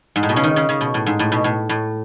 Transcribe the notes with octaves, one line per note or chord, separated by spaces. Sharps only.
G#2
A2
B2
C#3
D#3
C#3
C#3
B2
A2
G#2
A2
B2
A2
A2